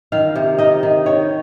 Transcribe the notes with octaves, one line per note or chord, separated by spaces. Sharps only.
D#3 F5
C3
D#4 D#5
D#3
D#3 C#5